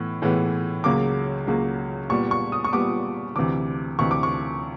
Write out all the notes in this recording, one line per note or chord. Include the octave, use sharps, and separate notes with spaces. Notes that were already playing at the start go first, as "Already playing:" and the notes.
Already playing: A2 E3 B3
A2 E3 G#3 B3
C#2 C#3 F#3 A#3 D6
C#2 C#3 F#3 A#3
A#2 G3 B3 C#6
C#6
D#6
C#6
A#2 G3 B3 D6
D2 C3 E3 D6
D2 C3 E3 C#6
D6
C#6